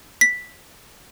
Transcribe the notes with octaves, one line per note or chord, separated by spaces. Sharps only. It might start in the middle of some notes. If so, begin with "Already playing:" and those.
B6